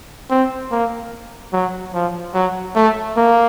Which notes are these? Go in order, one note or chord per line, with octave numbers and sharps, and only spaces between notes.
C4
A#3
F#3
F3
F#3
A3
A#3